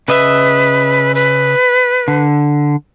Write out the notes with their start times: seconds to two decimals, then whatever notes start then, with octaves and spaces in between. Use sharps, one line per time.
0.08 C#3 B4 D#5 E5
1.15 B4
2.08 D3